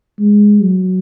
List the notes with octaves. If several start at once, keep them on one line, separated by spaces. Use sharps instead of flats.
G#3
F#3